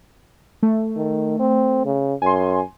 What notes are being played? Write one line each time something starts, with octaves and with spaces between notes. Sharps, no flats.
A3
D#3
C4
C#3
F#2 G#5 C6